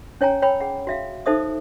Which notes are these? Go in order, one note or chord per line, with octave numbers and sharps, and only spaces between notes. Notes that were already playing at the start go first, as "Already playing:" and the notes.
C#4 C#5 G5 G#5 A#5
C#5 G5 B5 E6
G#4 F#5
F#4 E5 F5
D#4 A4 C5 E5 D6 D#6